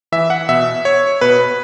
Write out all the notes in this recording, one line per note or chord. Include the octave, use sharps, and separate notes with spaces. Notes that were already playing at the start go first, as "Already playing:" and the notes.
E3 E5
F#5
B2 E5
C#5
B2 B4